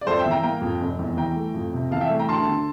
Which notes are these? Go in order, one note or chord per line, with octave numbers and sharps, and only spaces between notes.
D5
F2 A4 C5
E5 G5
E3
G5 A#5
A#3 G5 A#5
F2
F1
E2
E3 G5 A#5
A3
F2
C3
E3 F5 A5
E5 G5
A3
G5 A#5
D2 A5 C6
D3